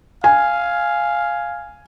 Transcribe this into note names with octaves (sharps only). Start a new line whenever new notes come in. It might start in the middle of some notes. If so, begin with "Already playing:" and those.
F5 G#5